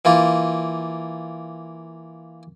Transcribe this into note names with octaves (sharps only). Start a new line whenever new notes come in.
E3 A#3 F4